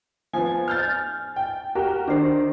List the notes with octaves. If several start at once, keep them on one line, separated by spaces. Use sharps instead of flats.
F3 B3 G#5
F6 G6 A6
G5
F#4 G4 A#4
D#3 D4 C5